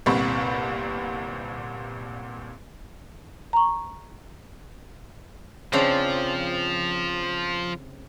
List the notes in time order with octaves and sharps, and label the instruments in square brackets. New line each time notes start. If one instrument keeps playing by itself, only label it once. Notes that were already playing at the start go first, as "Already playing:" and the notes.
[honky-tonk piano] G1 C2 A#2 C4 B5 C#6
[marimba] A#5 C#6
[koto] C#3 C4 D4 [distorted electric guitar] F3